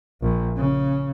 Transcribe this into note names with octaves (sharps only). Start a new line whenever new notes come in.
A#1
C#3